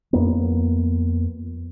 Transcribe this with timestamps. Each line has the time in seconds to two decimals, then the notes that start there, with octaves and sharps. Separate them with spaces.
0.13 F2 A#3 B3